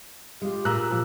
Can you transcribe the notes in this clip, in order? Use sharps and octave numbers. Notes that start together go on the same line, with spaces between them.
G#3 F4 G4
A#2 A#5 E6 F#6
F3